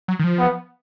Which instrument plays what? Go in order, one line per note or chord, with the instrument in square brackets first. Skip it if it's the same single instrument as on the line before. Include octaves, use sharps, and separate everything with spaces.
[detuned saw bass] F#3
D#3
F3
[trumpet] B3